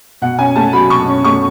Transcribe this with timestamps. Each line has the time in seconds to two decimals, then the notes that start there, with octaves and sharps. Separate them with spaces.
0.22 B2 F#5
0.39 C#4 G#5
0.56 A3 A5
0.73 F#3 B5
0.90 B2 C#6
1.08 C#4
1.24 A3 C#6